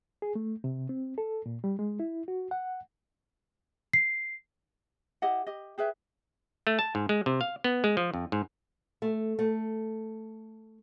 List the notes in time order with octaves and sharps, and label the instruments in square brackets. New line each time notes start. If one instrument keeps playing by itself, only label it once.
[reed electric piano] G#4
A3
C3
C4
A4
A#2
G3
G#3
E4
F#4
F#5
[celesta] C7
[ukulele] E4 G4 D#5 F#5
G4 D#5
G4 G#4 B4 E5
[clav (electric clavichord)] A3
A5
G#2
G#3
C3
F5
B3
G#3
F3
F2
G#2
[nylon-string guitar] A3
A3